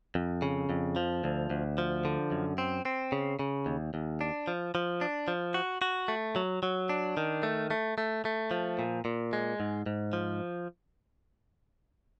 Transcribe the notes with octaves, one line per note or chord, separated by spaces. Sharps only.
F2
C#3
F2
F3
D2
D2
F3
D3
F#2
C4
C4
C#3
C#3
D#2
D#2
D4
F3
F3
D4
F3
F#4
F#4
A3
F#3
F#3
D4
D#3
A3
A3
A3
A3
F3
A#2
A#2
G#3
G#2
G#2
F3